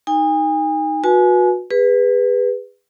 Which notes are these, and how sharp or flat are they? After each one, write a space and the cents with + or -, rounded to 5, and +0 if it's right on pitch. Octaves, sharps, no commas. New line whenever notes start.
D#4 +0 G#5 -40
F#4 -30 B4 -25 G#5 +30
G#4 -40 B4 +0